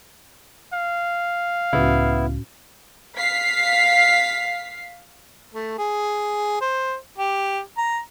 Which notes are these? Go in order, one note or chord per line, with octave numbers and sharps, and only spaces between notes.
F5
C#2 A2 B3 C#4 E4 F#4
F5 B6 C7
A3
G#4
C5
G4
A#5